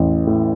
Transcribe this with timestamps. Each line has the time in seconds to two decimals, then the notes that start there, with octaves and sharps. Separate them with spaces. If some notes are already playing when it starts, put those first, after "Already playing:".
Already playing: A1 E2 E3
0.27 A2